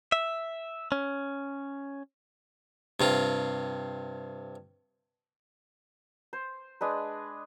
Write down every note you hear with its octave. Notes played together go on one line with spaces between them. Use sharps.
E5
C#4
G2 C3 F4
C5
G#3 D4 B4